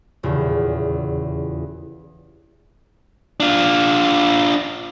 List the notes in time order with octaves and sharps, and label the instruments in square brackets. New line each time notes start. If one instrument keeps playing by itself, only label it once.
[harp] D#1 E2 C#3
[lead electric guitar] D4 F4